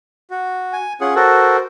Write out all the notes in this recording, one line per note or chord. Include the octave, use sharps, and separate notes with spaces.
F#4
G#5
C#4 F4 G#4 F#5
F#4 A4 A#4 C5